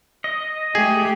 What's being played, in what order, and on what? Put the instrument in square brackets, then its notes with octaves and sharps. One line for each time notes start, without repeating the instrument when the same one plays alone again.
[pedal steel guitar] D#5
[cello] A3 G4 [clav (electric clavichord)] G#4